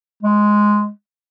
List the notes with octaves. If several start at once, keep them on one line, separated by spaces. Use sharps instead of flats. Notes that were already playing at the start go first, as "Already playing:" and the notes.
G#3